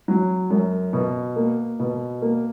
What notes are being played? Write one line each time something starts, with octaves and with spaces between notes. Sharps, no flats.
F#3
F#2
B2
A#3
B2
A#3